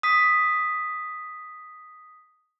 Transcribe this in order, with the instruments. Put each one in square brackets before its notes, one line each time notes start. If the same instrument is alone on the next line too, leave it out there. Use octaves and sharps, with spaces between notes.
[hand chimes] D#6 B6